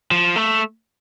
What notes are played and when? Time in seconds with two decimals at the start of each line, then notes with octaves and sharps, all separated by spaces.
0.11 F3
0.36 A3